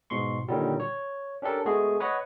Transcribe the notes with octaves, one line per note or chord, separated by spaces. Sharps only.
G#2 B2 C6 C#6
A#2 D3 D#3 F#3 G3
C#5
C#4 D4 G4 A4 A#4
G#3 A3 B3 F#4 G#4
B4 C#5 D#5 F#5